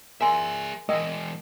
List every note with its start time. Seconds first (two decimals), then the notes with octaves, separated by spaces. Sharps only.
0.21 G#4 A#4 E5 G#5 C6
0.89 E3 G#3 A#4 D#5 G5